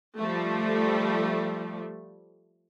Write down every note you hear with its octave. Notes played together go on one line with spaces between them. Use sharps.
F3 G3 A3